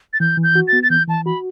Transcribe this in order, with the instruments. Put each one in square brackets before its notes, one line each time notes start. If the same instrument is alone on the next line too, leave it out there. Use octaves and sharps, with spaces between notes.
[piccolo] A6
[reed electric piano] E3 [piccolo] G6
[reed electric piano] E3
[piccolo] G6
[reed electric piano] F#4
[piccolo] A6
[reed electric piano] B3
[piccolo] A6
[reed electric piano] E3 [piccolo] G6
[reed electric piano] E3 [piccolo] A5
[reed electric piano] F#4 [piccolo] B5